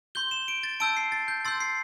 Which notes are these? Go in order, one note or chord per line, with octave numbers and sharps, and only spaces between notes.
C6 G6 G7
E7
D7
A6
A5 E6 G6 D7
C7
A6
G6
C6 E6 G6 A6
C7